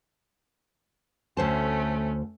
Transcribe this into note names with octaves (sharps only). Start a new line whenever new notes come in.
D2 A3 C#4 C5 A5